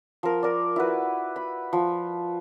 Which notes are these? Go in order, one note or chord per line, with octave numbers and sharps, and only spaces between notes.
F3 A#4
A#4 D5
E4 F#4 B4
B5
F3